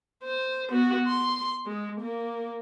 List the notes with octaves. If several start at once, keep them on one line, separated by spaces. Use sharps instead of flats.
C5
B3 F#4
C6
G#3
A#3